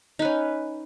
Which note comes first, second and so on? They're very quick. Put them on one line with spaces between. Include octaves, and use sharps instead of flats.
D#4 B4 C#4